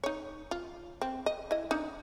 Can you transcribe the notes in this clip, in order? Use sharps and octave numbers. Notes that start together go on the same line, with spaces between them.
D#4 C#5
F4
C4
D#5
E4 D#5
D4 D#4